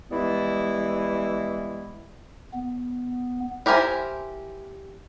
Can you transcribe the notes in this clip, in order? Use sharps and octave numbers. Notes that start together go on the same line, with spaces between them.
E3 G3 G#3 B3 E4
B3
E4 G4 A#4 C5 G#5